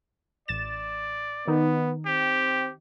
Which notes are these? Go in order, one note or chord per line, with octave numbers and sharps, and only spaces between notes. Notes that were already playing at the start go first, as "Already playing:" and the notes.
A1 D5 A6 E7
D#3 B3 D#4
C4 G4